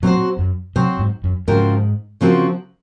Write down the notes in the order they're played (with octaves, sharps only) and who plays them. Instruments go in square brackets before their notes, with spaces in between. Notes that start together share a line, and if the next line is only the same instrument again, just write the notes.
[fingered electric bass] A#2 [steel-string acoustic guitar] F#3 C4 F#4 C5
[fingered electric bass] F#2
[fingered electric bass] C3 [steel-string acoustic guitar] F#3 C4 F#4 C5
[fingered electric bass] G#2
F#2
[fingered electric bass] G#2 [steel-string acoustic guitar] C#3 F3 C4 F#4 A#4
[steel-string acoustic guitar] C#3 F3 C4 F#4 A#4